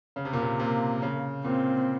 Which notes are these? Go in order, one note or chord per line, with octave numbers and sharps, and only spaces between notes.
C#3
C3
A#2
C3
C3 A#3
C#3
A#2 C4